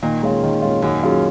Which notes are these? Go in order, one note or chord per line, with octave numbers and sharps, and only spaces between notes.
A#2 D#3
G#3 C#4 F4
D#3
G#3 C#4 F4
F#2 D#3
F#3 C#4 F4 G#4